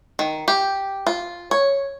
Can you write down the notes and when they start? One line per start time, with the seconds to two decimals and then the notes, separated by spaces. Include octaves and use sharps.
0.19 D#3
0.48 G4
1.07 F4
1.51 C#5